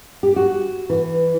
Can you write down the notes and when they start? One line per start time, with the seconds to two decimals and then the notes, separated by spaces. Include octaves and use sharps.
0.23 G4
0.36 F#4
0.90 E3